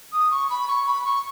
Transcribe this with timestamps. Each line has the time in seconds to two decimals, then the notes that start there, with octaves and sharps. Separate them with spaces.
0.12 D#6
0.31 C#6
0.50 B5
0.68 C#6
0.87 B5
1.05 C#6